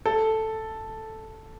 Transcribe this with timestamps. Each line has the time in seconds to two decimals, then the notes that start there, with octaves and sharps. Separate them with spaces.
0.06 A4